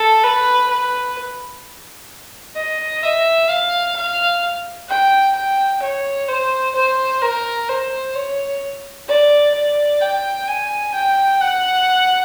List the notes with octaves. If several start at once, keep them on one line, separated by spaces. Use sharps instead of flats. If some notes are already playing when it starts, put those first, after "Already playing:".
Already playing: A4
B4
B4
D#5
E5
F5
F5
G5
G5
C#5
C5
C5
A#4
C5
C#5
D5
D5
G5
G#5
G5
F#5